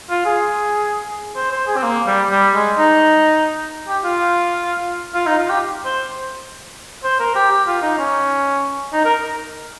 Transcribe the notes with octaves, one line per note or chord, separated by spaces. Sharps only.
F4
G#4
C5
C5
G#4
C4
A#3
G3
G3
G#3
D#4
G4
F4
F4
D#4
F4
G4
C5
C5
A#4
G4
G4
F4
D#4
C#4
D#4
A#4